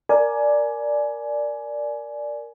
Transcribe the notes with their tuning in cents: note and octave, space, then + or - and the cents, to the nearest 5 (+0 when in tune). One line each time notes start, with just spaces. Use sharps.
A#4 +0 D5 +0 G#5 +20